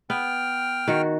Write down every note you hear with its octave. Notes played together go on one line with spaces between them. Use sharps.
B3 G5 F6
D#3 F#4